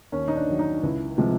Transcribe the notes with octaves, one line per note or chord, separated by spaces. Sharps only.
D#2 C#4
D#4
D4
D#3 F#3
D#4
C#2 E4
C3 F3 G#3